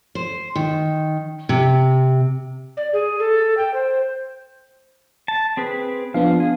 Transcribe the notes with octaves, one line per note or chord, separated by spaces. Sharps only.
C5
D#3
C3
D5
G#4
A4
G5
C5
A5
C4 G#4 B4
F3 B3 D4 F5
G#4